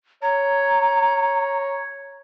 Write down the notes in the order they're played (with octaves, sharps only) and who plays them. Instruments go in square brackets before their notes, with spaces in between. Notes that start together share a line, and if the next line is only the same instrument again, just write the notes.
[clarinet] C#5 [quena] A#5